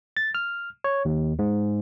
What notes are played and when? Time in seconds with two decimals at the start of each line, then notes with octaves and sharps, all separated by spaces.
0.17 A6
0.35 F6
0.84 C#5
1.05 D#2
1.39 G#2